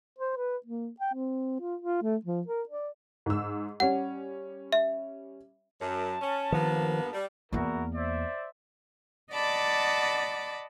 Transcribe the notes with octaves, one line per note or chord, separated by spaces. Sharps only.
C5
B4
A#3
G5
C4
F4
F4
A3
F3
A#4
D5
G#2 E6
G3 C#4 F#5
E5
F#2 A5
C#4
G2 D#3 F3 A#3 B3
G3
E2 A#3 E4 F#4 A#4
C5 D5 E5
D5 D#5 F#5 A5 B5 D6